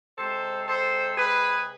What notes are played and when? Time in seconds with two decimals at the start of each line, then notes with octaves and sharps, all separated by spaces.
0.18 C3 G#3 A4 C5
0.67 A4 C5
1.18 G#4 B4